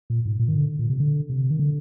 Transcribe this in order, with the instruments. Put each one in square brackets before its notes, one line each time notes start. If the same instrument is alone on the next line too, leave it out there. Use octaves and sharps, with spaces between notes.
[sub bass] A#2
G#2
A#2
D#3
D3
A#2
C3
D3
C3
D#3
D3